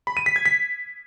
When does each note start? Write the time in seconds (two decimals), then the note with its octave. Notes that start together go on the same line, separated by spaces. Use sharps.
0.07 B5
0.17 D#7
0.26 B6
0.36 G#6
0.45 B6